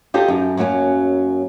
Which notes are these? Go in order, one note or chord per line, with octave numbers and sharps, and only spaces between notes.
D#4 F4 G4 A4 D#5
F#2
F#2 F#3 A#3 C4 C#4